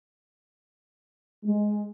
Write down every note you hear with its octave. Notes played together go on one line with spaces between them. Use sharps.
G#3